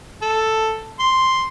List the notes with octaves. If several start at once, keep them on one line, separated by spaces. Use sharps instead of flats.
A4
C6